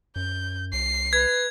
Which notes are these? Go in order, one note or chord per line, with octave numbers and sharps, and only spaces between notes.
F#2 G6
C2 C7
B4 G#6